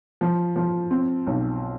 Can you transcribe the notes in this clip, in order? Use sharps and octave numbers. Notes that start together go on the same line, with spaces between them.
F3
F3
C4
B1